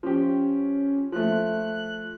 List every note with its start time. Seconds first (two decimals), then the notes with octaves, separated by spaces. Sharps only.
0.03 F3 C#4 G4
1.12 F3 A3 F#6